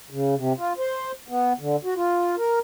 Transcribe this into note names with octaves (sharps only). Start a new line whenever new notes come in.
C#3
C3
F4
C5
B3
D3
F#4
F4
A#4